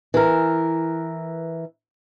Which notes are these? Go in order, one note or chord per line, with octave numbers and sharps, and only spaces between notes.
E3 A#4